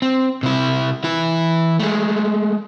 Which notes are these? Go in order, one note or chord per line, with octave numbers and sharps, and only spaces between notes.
C4
C3 E4
E3 E4
G#3 A3